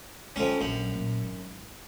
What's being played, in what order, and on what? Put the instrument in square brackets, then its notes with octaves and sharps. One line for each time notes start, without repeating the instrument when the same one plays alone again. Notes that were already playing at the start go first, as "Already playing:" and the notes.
[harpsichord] F2 C#4 [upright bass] D3 G#3
[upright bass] A#1 F#3 [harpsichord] F#2
[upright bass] A#2
G#1